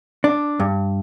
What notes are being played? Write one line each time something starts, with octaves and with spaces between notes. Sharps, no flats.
D4
G2